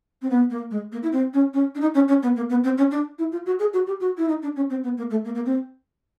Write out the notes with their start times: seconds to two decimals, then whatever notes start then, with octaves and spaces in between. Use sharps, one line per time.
0.22 C4
0.30 B3
0.50 A#3
0.71 G#3
0.92 A#3
1.03 E4
1.12 C4
1.34 C#4
1.54 C#4
1.75 D4
1.81 D#4
1.94 C#4
2.08 C#4
2.23 B3
2.36 A#3
2.50 B3
2.64 C4
2.78 C#4
2.91 D4
3.19 E4
3.32 F4
3.46 F#4
3.59 G#4
3.73 F#4
3.87 G4
4.00 F#4
4.18 E4
4.28 D#4
4.42 D4
4.56 C#4
4.70 C4
4.84 B3
4.97 A#3
5.10 A3
5.25 A#3
5.35 A#3
5.46 C4